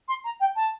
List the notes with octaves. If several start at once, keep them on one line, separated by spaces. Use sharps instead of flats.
C6
A#5
G5
A5